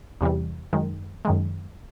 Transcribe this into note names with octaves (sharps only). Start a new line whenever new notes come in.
E2 C3 E3 G3
F#2 D#3 G#3
F#2 D#3 G#3